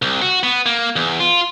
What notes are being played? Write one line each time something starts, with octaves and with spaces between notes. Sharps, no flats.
C2
F#4
B3
A#3
E2
F4